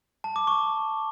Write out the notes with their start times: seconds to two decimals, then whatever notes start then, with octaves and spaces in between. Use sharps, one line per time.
0.24 A5
0.36 D6
0.47 C#6